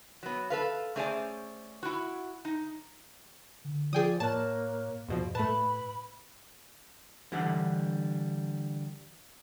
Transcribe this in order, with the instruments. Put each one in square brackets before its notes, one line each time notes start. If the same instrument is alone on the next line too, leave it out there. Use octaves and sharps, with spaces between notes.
[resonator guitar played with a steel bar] F#3 B3
A4 B4 F5
A3 C#4 G#4 C5 D5 G#5
E4 F#4
D#4
[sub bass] D3
[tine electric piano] F3 F4 [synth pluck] G#4 G5 D#6 [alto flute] D5
[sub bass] A2 [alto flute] A#3 [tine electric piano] C#5 F#6 [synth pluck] A5
[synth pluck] E2 B2 F3 [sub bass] G2
[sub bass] A2 [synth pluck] A3 A5 [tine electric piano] B4 [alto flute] B5
[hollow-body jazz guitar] D3 E3 G3 D4 F#5